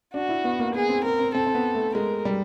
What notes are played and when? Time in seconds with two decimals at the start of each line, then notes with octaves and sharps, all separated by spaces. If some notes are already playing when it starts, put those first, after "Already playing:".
0.14 D4 F#4
0.29 E4
0.44 B3
0.59 A#3
0.74 B3 G#4
0.89 C4
1.04 C4 A#4
1.19 C4
1.35 C4 A4
1.46 C4
1.55 B3
1.75 A3
1.95 G#3 A#4
2.25 G3